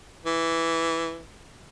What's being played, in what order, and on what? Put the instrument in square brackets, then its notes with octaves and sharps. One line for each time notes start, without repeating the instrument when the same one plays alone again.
[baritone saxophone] E3